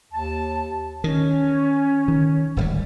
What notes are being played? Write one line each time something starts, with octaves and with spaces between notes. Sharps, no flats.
D#2 A5
D#3 C#4
D#3
D1 G#1 G3